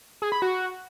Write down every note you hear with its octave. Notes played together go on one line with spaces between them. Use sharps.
G#4
B5
F#4